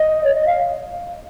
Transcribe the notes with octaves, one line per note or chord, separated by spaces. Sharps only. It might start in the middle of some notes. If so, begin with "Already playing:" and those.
Already playing: D#5
C#5
D#5
F5